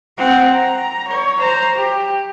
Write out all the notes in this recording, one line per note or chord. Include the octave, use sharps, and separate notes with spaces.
C4 F#5
A#5
C#5
C5 A#5
G4